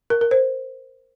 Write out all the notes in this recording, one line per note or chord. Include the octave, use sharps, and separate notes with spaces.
A#4
A#4
C5